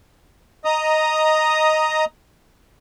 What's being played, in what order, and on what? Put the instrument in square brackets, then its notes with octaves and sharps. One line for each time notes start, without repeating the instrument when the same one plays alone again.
[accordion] D#5 A#5 D#6